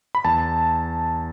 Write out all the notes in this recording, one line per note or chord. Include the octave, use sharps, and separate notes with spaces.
B5
E2 A5